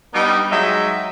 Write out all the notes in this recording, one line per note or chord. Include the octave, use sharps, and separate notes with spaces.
G3 B3 D4 D#4
F#3 G#3 D#4 D#5 E5 G5